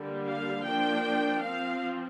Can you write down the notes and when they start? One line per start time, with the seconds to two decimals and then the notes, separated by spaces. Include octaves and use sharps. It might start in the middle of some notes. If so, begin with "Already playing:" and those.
Already playing: D3 G3 A#3
0.27 F5
0.65 F3 A#3 D4 G5
1.42 F3 C4 F5